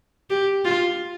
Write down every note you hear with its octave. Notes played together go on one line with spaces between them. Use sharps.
G4
F4